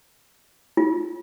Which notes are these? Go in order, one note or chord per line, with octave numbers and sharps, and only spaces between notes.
F4